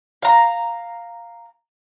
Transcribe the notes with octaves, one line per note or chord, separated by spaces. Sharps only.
F5 A#5